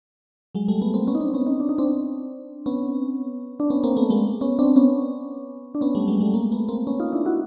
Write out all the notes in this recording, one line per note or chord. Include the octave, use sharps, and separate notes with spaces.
F#3 G#3
G3 A3
A3 B3
A#3 C4
B3 C#4
D#4
C4 D4
B3 C#4
C#4 D#4
D4
D#4
C4 D4
B3 C#4
D4
B3 C#4
A#3 C4
A3 B3
G#3 A#3
B3 C#4
C4 D4
B3 C#4
D4
B3 C#4
G3 A3
F#3 G#3
G3 A3
G#3 A#3
A3 B3
A#3 C4
B3 C#4
D#4 F4
D4 E4
E4 F#4